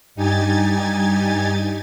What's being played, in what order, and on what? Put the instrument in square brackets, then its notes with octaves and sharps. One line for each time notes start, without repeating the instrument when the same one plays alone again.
[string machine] G2 D#4 G4 G#5 G#6 A6